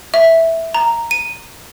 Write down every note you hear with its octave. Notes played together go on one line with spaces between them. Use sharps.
E5
A#5
D#7